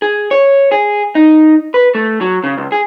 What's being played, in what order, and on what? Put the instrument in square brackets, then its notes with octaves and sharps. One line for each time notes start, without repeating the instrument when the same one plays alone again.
[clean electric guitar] G#4
C#5
G#4
D#4
B4
A3
F#3
C#3
C#2
G#4